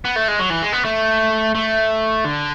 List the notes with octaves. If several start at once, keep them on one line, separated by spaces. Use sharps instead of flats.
B3
A3
G#3
F#3
E3
G#3
B3
A3
A3
D3